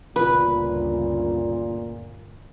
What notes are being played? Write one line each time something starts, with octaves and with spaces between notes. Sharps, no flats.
G1 D2 A#2 C#3 B4